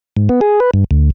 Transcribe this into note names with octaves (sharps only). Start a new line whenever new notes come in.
G#2
B3
G#4
B4
G2
D2